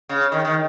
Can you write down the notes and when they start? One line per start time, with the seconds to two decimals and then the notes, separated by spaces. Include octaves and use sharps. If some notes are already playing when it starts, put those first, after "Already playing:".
0.09 C#3
0.32 D#3
0.45 D#3